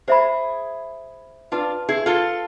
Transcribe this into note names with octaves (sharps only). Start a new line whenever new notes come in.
E4 G#4 C5 E5 B5
D4 F4 B4 F5 A5 C6
E4 G#4
F4 A4